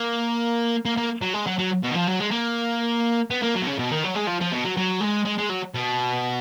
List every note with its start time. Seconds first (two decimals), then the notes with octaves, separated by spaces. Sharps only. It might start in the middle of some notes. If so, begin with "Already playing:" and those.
Already playing: A#3
0.85 A#3
0.97 A#3
1.21 F#3
1.33 G#3
1.47 F#3
1.59 F#3
1.84 B2
1.92 D#3
1.95 F3
2.08 F#3
2.20 G#3
2.32 A#3
3.30 B3
3.42 A#3
3.55 F#3
3.62 B2
3.67 C#3
3.78 B2
3.91 D#3
4.04 F#3
4.15 G#3
4.27 F3
4.40 F3
4.52 B2
4.65 F#3
4.77 F#3
5.01 G#3
5.25 G#3
5.38 G#3
5.50 F#3
5.75 B2